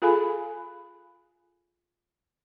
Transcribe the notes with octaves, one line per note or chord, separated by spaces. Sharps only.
F4 G#4 A4 F5 G#5 B5